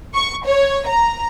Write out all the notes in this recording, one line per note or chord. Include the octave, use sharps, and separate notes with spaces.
C#6
C#5
A#5